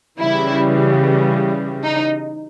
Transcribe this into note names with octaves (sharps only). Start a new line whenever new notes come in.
C#3 E3 G3 E4
D#4